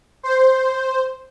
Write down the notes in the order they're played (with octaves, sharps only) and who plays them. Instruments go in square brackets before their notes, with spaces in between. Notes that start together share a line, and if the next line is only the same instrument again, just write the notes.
[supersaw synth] C5